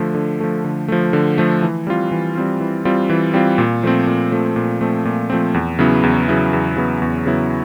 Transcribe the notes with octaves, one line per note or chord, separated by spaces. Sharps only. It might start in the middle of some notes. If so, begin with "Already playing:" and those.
Already playing: D3 F3 A3
D3
F3 A3
D3
F3 A3
D3
F3 A3
E3
G3 C4 F4
E3
G3 C4 F4
E3
G3 C4 F4
E3
G3 C4 F4
A#2
F3 A3 C4
A#2
F3 A3 C4
A#2
F3 A3 C4
A#2
F3 A3 C4
E2
C#3 F#3 B3 E4
E2
C#3 F#3 B3 E4
E2
C#3 F#3 B3 E4
E2
C#3 F#3 B3 E4